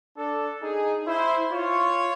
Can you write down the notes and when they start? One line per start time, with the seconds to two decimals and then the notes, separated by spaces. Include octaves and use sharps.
0.17 D4 A4
0.62 D#4 G#4
1.07 E4 C5
1.51 F4 C#5